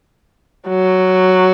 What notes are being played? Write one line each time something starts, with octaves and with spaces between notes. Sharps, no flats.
F#3